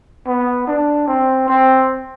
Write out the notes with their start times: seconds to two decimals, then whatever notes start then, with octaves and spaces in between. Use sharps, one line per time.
0.27 B3
0.67 D4
1.08 C4
1.48 C4